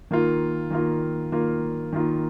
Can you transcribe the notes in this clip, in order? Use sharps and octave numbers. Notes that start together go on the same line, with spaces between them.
D#3 A#3 F4
D#3 A#3 F4
D#3 A#3 F4
D#3 A#3 F4